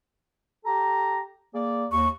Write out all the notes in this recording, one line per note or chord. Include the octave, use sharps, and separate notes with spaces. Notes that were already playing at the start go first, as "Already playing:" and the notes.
G4 A4 A#5
A#3 G#4 D5
D#2 C#6